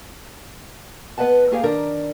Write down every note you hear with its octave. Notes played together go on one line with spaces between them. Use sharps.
B3 B4 D#5 F#5 A5
A3 A#3 G4 G#4 F5
D#3 D4 A#4